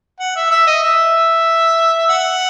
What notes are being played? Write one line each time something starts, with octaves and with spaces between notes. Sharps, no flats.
F#5
E5
E5
D#5
E5
F#5